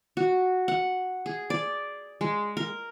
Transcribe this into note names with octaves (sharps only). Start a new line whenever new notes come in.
F#4
F#5
G#4
D5
G#3
A#4